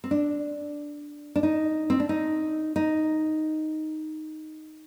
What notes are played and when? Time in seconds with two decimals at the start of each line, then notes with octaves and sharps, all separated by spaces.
0.04 C4
0.11 D4
1.36 D4
1.43 D#4
1.90 C4
2.00 D4
2.09 D#4
2.76 D#4